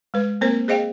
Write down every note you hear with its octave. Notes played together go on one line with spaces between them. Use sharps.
G#3 B4
A#3 C4 A#4 C5
G#4 C5 D#5 F5 G5